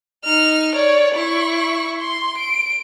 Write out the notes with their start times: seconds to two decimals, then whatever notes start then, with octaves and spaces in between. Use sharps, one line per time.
0.25 D#4 F6
0.75 C#5 D5
1.15 E4 C#6
2.00 C6
2.38 D7